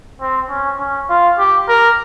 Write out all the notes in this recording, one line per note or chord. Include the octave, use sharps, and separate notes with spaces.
C4
C#4
C#4
F4
G4
A#4